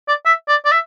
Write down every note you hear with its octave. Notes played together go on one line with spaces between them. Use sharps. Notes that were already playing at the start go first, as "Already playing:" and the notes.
D5
E5
D5
D5
E5